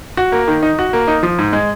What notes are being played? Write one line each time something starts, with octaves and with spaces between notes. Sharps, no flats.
F#4
A#3
D#3
D#4
F#4
A#3
D#4
F3
G#2
G#3